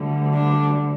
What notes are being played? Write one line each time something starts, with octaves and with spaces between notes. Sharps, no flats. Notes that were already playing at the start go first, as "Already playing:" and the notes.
Already playing: D2 D3 G3
D4